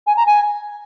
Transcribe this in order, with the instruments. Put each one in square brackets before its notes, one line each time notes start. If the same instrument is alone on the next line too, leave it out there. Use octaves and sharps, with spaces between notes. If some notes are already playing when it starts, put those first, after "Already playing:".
[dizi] G#5
A#5
G#5